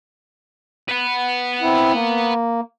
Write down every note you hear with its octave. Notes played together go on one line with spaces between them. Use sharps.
B4 F#5
C4 E4
A#3